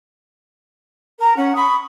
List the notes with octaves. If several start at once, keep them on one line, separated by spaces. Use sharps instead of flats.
A#4 A#5
C#4 F#5
B5 C#6 D#6